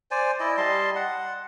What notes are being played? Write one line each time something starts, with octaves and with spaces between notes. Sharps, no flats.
C5 D5 G#5
E4 D5 D#5
G3 D#5 A5 C6
F#5